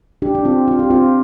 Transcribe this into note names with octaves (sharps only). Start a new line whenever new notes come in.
D4 G4
D4
C4 F4
F4
G4
C4 F4